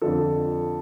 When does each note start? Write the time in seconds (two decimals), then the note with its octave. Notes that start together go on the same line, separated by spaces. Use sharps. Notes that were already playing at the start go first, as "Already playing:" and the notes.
0.02 F2 D3 F3 A4